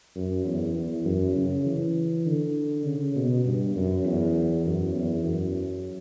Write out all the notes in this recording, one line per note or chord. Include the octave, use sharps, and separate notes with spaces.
F#2
E2
E2
F#2
C#3
E3
D3
C#3
B2
G2
F#2
E2
F#2
E2
F#2